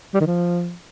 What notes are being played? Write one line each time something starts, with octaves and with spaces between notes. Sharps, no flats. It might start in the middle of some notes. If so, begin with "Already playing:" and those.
G3
D#3
F3